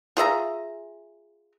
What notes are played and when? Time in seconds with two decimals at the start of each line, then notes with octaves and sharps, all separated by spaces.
0.17 F4 G#4 E5 A#5